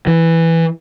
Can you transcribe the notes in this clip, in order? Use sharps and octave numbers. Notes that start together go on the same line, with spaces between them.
E3